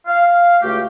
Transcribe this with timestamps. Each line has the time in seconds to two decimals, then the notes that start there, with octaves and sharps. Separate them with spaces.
0.07 F5
0.62 C#2 A3 F#4 G4